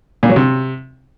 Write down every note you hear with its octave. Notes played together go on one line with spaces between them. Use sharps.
A#2
F#3
C3